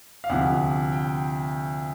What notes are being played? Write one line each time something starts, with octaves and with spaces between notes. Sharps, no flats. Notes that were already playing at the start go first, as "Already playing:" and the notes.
F5
D2 C3 F3 F#5
G5